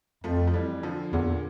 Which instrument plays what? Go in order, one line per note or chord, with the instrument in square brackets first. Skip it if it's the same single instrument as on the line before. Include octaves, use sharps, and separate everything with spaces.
[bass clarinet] F2 [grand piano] F3 A3
[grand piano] F3
E3 G3
D3 F3
[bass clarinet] E2 [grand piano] A#2 D3